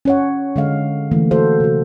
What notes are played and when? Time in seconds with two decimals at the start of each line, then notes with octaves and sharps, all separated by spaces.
0.05 C#4 C#5 F#5
0.56 D3 G#3 F5
1.11 D3 E3 A3 A#3
1.31 F#4 A4 C5 F5
1.60 C3 F#4